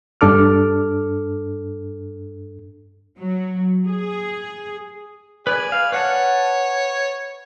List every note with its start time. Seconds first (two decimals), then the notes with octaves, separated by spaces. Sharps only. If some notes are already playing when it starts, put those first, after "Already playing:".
0.21 G2 D4 A4 D6 F6
3.19 F#3
3.87 G#4
5.47 G#4 B4 D5
5.72 F5
5.92 B4 C#5 F#5 A5